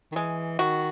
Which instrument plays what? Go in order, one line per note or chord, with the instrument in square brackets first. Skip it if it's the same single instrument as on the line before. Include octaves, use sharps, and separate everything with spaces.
[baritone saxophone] D#3
[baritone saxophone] E3 [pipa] G#3
[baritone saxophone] D#3 [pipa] F#4